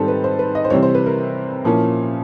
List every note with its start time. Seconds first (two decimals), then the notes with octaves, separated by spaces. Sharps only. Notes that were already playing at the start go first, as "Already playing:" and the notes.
Already playing: G#2 D#3 G3 C4 A4
0.08 B4
0.24 C5
0.39 B4
0.55 D#5
0.65 C5
0.70 C3 E3 G3 C4 C#5
0.83 C5
0.95 B4
1.06 A#4
1.65 A#2 F3 A#3 C#4 E4